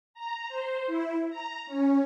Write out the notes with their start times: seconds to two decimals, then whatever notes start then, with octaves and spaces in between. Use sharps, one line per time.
0.14 A#5
0.49 C5
0.87 E4
1.30 A#5
1.66 C#4